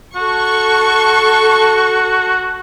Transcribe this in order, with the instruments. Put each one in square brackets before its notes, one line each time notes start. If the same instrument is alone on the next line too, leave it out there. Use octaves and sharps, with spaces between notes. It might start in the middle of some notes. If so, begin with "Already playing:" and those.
[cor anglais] F#4 [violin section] A4 C#6